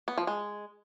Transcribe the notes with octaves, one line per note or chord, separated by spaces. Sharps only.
B3
F3
G#3